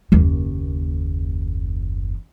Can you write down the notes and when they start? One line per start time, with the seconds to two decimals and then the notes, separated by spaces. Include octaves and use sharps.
0.12 F#1 D#2